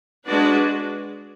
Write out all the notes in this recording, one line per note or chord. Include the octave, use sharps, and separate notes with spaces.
G#3 D4 F#4 B4 D5